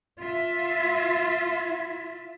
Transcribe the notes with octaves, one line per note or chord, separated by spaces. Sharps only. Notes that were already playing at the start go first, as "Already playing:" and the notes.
F4 E5